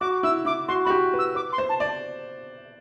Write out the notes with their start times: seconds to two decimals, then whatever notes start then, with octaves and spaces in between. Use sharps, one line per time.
0.01 F#4 D6
0.23 E4 E6
0.45 E4 D6
0.68 F#4 C6
0.85 F#4 B5
0.90 G4
1.14 B4 E6
1.35 B4 D6
1.52 C6
1.58 C5
1.69 A5
1.80 D5